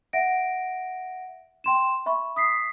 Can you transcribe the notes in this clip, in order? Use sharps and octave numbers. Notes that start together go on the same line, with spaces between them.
E5 F#5 A#6 D7
G5 C6 E7
E5 B5 C#6
D#6 B6 C7